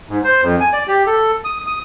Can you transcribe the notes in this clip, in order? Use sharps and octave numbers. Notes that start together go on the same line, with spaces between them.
G#2
C5
F2
G#5
D5
G4
A4
D#6
D#6